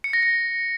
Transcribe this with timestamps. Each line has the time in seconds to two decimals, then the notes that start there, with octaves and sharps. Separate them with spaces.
0.04 C#7
0.13 A#6
0.23 C#7